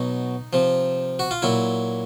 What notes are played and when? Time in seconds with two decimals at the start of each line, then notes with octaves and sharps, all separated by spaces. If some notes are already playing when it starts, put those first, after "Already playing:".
Already playing: B2 F#3 D#4
0.53 C3 F3
1.19 F#4
1.31 F4
1.42 A#2 F#3 E4